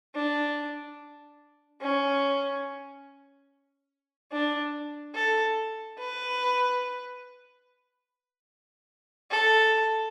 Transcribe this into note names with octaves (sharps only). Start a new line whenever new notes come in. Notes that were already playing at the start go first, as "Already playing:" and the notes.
D4
C#4
D4
A4
B4
A4